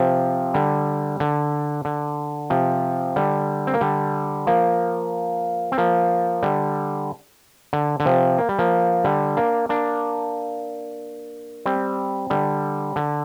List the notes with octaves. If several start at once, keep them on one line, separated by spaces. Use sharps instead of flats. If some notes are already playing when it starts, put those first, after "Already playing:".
Already playing: C3 F3
D3 G3
D3
D3
C3 F3
D3 G3
C4
A#3
D3 G3
F3 A#3
C4
F3 A#3
D3 G3
D3
D3
C3 F3
A#3
G3
F3 A#3
D3 G3
A#3 D4
A#3 D4
G3 C4
D3 G3
D3